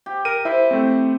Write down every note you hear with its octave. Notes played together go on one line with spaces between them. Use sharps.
G4
A#4 D#7
E4 C5 E5
A3 C4